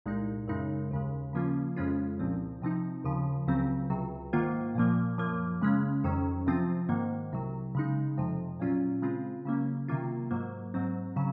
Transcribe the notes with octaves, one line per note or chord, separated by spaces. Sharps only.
C2 A#2 G#3 D#4
F#2 C#3 G#3 D#4
D#2 C#3 G#3
C#3 F3 A#3 C#4 F4
F2 C#3 G#3 C#4 F4
C2 A#2 F3 C4
C3 F3 C4 D#4
D#2 C#3 F3
C#2 C#3 F#3 C4
C#2 C3 F#3
G#2 D#3 A#3 F4
A#2 F3 A#3
F#2 F3 A#3
C#3 G#3 C#4
F2 D#3 F#3 C#4
C3 F3 C4 F4
G#2 D#3 A#3
C2 C3 F#3
C#3 G#3 D#4
F2 C3 F3
A#2 F#3 C#4 F4
C#3 G#3 C4 F4
C#3 F#3 A#3 C#4
C3 D#3 F#3 A#3 F4
G#2 F#3 A#3
G#2 F#3 C4
C#3 F#3